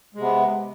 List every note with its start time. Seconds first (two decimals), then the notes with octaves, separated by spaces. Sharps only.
0.14 G#3
0.18 C3
0.21 B3